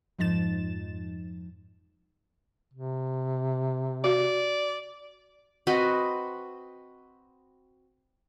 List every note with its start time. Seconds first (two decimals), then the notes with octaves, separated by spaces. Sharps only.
0.19 F2 G#2 F3 D#4 A6 E7
2.73 C3
4.04 F#4 D5 F5
5.67 C4 F#4 B4 D#5